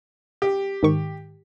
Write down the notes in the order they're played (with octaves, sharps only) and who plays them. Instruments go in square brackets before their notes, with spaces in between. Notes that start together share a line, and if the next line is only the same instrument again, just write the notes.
[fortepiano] G4
[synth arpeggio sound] G#2 D#3 C#6